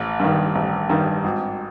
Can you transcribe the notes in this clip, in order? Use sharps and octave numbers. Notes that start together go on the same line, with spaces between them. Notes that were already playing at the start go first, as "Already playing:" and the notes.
Already playing: A1
G2 D#3
A1
G2 D#3
G#1